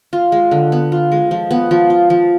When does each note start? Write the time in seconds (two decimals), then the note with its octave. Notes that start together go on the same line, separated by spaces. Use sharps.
0.13 F4
0.32 G#3
0.51 D3
0.72 B3
0.92 F4
1.12 G#3
1.31 F3
1.51 B3
1.71 F3
1.90 F4
2.10 F3